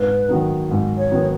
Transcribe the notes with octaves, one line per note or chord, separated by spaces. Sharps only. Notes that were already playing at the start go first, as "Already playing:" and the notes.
Already playing: G#2 B4
D#3 F#3 B3 D#4
G#2
C#5
D#3 F#3 B3 D#4